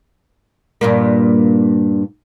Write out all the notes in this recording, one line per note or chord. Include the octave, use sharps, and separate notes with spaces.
G2 A#2 A#3